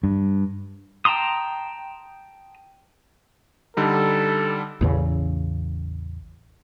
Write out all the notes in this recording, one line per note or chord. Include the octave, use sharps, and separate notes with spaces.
G2
G5 A5 A#5 C6 D#6
D3 G3 D#4 A4
A1 E2 C#3